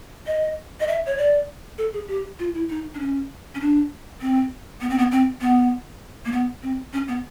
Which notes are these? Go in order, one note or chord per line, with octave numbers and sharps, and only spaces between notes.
D#5
D#5
E5
C#5
D5
A4
G#4
G4
F4
E4
D#4
D4
C#4
C#4
D4
C4
B3
C4
B3
C4
B3
A#3
B3
C4
C#4
B3